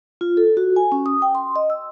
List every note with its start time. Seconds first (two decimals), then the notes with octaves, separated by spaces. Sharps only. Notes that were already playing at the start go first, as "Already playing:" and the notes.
0.21 F4
0.37 A4
0.57 F#4
0.76 G#5
0.92 C#4
1.06 D#6
1.22 G5
1.35 C6
1.56 D#5
1.70 E6